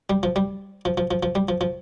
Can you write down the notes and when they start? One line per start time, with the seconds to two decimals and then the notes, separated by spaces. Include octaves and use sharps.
0.10 G3
0.23 F3
0.36 G3
0.85 F3
0.97 F3
1.11 F3
1.23 F3
1.35 G3
1.48 F3
1.61 F3